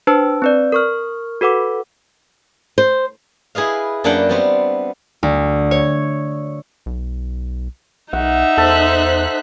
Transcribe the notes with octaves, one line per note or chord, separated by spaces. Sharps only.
D4 B4 C5 A5 E6
C4 B4 D5
A#4 C#6 F6
F#4 A4 B4 F#5 D6
C5
E4 G#4 B4 D#5 F5
F#2 A#3 D4 B4 F#5 G5
G3 B3 C4
D2
C#5
B1
B1 D#4 E5 F#5
E2 A4 C5 F#6 B6